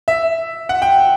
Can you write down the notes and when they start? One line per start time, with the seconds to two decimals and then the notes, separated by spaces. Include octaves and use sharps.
0.08 E5
0.69 F#5
0.82 G5